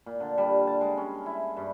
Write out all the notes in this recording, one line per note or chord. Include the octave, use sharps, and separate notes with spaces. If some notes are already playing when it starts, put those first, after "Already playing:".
A#2
D3
G3
A5
G#3
C#4
E4
G2